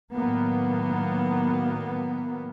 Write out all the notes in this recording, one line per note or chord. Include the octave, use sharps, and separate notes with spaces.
A2 D#3 F#3 A#3 B3